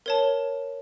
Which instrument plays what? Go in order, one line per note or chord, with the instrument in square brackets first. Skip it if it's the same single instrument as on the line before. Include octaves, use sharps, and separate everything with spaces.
[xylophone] A#4 C#5 A5